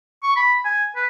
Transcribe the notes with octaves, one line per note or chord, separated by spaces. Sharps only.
C#6
B5
G#5
B4